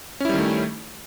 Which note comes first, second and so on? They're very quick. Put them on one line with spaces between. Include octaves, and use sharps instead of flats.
C#4 E4 G3 D#3 A3